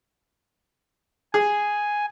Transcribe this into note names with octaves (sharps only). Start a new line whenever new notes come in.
G#4 G#5